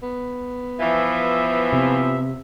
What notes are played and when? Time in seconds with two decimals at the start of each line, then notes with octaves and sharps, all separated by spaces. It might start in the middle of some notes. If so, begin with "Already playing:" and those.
0.03 B3
0.80 E3 F3 E5
1.73 C3